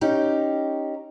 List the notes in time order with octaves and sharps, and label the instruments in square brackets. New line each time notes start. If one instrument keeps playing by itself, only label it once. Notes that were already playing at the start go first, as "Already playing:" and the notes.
[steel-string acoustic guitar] C#4 D#4 G4